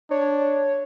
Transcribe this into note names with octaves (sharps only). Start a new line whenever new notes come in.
D4 C#5